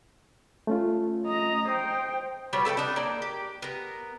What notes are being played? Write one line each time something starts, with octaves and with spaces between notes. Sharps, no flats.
A3 C#4 F4
D#5 A#5
C5 G5 D#6
B2 G3 B3 C#5
A4 B4 F5 G5
D4 D#4
A#3 D5
G4
B3 A#4